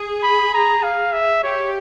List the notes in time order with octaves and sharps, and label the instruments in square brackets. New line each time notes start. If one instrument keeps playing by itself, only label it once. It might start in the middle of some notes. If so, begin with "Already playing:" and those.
Already playing: [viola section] G#4
[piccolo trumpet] B5
A#5
F5
E5
[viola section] G4 [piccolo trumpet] C#5